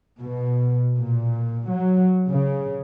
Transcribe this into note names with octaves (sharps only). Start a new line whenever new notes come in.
B2
A#2
F#3
C#3